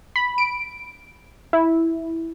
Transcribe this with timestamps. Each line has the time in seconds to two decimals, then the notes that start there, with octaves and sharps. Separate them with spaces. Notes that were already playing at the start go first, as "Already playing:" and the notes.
0.16 B5
0.38 D7
1.53 E4